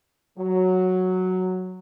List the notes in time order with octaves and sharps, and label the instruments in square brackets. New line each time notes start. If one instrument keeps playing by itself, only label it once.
[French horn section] F#3